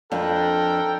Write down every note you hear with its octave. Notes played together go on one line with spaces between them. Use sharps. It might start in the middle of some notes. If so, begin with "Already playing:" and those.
F2 D4 A4 A#4 G5